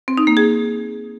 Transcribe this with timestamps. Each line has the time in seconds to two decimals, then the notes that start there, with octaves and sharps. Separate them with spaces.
0.08 C4
0.17 D#4
0.27 A#3
0.37 G#4